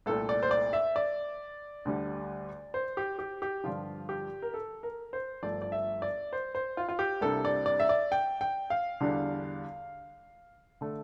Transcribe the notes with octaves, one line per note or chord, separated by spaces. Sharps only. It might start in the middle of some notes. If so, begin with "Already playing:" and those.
C2 A#2 A3 A4
D5
C5
D5
E5
D5
D2 D3 G3
C5
G4
G4
G4
G2 D3 F3 F4
G4
A#4
A4
A#4
C5
G1 G2 F3 A3 D5
D5
E5
D5
C5
C5
F4
F4
G4
C2 C3 G3 A#3 D4 A4
D5
D5
E5
D5
G5
G5
F5
E2 D3 G3 D4
D3 A3